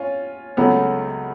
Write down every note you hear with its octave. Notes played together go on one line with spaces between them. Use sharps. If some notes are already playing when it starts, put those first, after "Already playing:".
Already playing: C#4 F4
C#2 C#3 F#3 A3 B3